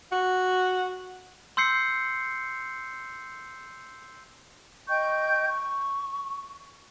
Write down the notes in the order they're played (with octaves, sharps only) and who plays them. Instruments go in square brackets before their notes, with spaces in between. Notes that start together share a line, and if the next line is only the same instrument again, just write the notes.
[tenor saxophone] F#4
[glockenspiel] C6 E6 G6 C7 C#7
[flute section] D#5 G5 C#6 G6
C#6